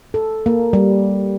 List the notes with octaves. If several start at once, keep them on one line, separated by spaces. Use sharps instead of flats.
A4
A#3
G3